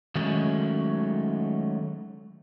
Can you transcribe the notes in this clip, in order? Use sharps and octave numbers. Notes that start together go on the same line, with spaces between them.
D#3 F#3 G#3 A3 C#4